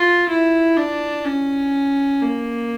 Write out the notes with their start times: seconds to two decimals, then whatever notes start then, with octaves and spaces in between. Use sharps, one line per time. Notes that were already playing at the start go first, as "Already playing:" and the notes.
Already playing: F4
0.29 E4
0.77 D4
1.25 C#4
2.22 A#3